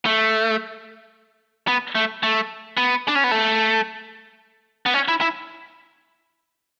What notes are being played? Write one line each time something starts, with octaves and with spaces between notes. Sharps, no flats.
A3
B3
A3
A3
B3
D4
C#4
B3
A3
B3
C#4
E4
E4